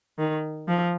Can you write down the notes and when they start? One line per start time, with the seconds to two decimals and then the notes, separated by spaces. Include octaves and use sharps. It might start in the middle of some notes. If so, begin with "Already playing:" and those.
0.19 D#3
0.68 F3